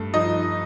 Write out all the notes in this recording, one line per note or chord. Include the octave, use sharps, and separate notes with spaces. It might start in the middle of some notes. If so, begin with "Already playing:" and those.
Already playing: G2 A3
F3 D#4 D#5